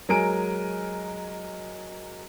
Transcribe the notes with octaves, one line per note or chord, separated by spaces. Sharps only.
F#3 G#3 A#4 G#5 D7